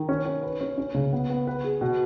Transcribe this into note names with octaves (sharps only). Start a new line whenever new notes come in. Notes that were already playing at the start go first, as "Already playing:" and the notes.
Already playing: D#3
C#4
C#4
B4
C#4
C#4
C#3
B3
B3
B4
G#4
B2